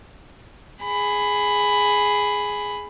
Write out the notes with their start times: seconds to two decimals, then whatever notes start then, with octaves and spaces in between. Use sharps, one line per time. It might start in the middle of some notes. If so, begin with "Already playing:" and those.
0.83 G#4 B5